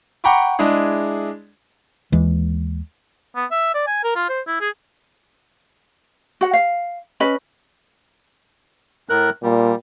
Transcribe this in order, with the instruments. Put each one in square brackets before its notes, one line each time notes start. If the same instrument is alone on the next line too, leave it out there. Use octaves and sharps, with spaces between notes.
[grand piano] F#5 G5 A#5 B5 C#6 D6
G#3 D4 E4 G#4
[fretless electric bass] D#2 E3 G#3
[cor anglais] B3
E5
D5
G#5
A#4
F4
C5
E4
G#4
[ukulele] F#4 F#5
F5
C#4 B4 D#5
[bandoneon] A2 A#4 F#6
[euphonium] A#2 [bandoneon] G3